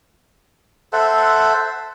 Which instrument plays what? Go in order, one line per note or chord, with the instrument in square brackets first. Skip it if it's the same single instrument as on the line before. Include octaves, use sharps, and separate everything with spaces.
[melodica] A4 C5 E5 F#5